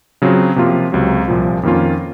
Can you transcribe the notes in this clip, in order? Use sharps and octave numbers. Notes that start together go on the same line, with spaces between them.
C#3 F#3 C4 F4 G#4
C3 F3 A#3 F4
C#2 C3 F#3
C2 A#2 F3
F2 D#3 A#3 C#4 F4